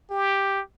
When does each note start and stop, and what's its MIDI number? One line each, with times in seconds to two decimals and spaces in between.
0.11 0.61 67